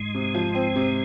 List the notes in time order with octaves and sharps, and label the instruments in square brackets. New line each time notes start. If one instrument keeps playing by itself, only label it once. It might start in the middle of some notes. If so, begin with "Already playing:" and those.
Already playing: [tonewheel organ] G#2 G#3
[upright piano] C3
F3
C4
C3